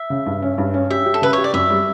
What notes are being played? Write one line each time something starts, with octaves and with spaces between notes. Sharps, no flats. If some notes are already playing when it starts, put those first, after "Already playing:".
Already playing: E5
C#3
G2
C#4
G2
C#4
G4 E5
G4
A4
C#3 B4
G4 C#5
D5
F#2 E5
G3